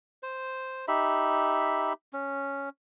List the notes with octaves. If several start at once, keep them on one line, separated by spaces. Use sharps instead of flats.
C5
D#4 G4 E5 B5
C#4